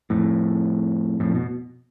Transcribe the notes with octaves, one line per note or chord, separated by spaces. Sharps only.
F2 A2
F2 A2
B2